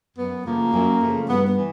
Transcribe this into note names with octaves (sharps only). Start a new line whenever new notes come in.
F#2 B3
C#3 F3 A3 A#3
F#2
C#3 F3 A3
G2 B3
B3
E3